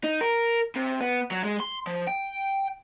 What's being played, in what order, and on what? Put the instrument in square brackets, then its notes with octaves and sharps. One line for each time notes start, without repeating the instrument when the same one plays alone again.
[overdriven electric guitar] D#4
A#4
C3
B3
F#3
G#3
C6
F3
G5